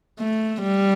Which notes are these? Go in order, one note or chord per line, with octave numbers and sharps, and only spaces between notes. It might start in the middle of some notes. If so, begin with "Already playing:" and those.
A3
G3